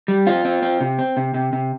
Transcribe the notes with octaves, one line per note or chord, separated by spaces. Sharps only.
G3
C4 F4
C4
C4
C3
C4
C3
C3
C3